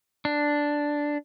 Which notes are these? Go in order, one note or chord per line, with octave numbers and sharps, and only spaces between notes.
D4